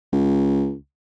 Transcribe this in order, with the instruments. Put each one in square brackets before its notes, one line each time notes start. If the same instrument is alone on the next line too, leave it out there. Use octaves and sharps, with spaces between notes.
[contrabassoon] C#2